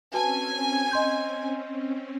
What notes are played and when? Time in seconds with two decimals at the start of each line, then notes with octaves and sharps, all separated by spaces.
0.14 C4 C#4 F#4 B4 G#5 A5
0.91 D#5 C6 G6